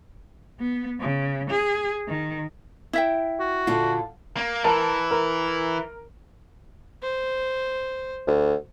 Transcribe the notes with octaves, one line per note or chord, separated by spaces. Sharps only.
B3
C#3
G#4
D#3
E4 E5 G5
F#4
A#2 D3 F4
A#3
E3 A#4 A5
A#4
C5
D2